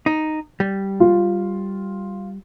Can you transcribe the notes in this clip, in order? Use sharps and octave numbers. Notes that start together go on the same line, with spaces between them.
D#4
G3
F4